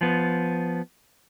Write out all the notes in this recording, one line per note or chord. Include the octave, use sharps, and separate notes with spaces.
F3 B3